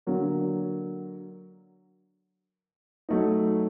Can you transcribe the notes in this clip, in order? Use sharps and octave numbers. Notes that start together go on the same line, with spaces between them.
D3 F#3 A#3
F#3 A3 D#4